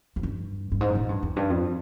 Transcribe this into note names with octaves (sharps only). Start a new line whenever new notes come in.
F2
G2
G2
G#2
A#2
G2
F2
G2
F2